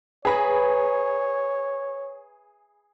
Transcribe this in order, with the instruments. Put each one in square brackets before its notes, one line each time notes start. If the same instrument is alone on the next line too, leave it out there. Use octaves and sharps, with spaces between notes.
[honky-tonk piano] G#4 B5 [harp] B4 E5 A#5 [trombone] C#5